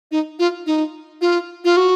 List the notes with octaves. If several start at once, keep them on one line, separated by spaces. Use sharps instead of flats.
D#4
F4
D#4
F4
F4
F#4